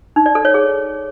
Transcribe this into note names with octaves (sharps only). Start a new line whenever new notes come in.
D#4
D5
A4
C#5
G#4